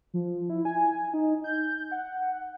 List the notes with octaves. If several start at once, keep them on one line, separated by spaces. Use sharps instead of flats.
F3
E4
G#5
D#4
G6
F#5